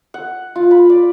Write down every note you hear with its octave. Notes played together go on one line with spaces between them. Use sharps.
F#5
F4
B5
D5